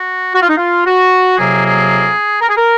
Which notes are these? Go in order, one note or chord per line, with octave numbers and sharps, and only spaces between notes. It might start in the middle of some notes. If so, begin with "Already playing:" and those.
Already playing: F#4
F#4
F4
D#4
F4
F#4
F2 C3 F#3 A#3 G#4
G#4
A#4
G#4
A#4